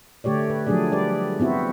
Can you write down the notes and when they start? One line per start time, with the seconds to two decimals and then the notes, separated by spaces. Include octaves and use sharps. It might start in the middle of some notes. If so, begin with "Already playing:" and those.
0.24 D3 A3 G4 C#5 D5
0.49 B4
0.67 F3 F#3 A3 D4 G#4 D5
0.92 G3 G4 B4 D5
1.40 B3 C4 E4 F#4 E5